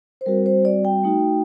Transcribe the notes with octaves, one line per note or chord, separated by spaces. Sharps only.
C5
G3 C4 F#4 A#4
C5
D5
G5
A3 D#4 F#4